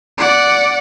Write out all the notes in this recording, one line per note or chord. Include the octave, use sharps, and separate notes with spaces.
D5 F#5